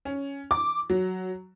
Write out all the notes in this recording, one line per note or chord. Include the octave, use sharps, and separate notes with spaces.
C#4
D6
F#3